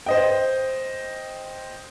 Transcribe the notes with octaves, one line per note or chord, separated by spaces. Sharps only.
C5 D#5 G5